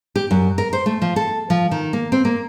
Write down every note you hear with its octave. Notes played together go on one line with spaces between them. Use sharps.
G4
F#2
A#4
C5
A3
F3
A4
F3
D#3
A#3
C4
A#3